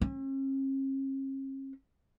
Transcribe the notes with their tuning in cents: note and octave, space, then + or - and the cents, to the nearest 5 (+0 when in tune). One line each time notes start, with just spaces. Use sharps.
C#4 -45